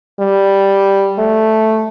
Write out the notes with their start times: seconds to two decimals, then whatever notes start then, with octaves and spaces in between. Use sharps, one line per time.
0.20 G3
1.18 A3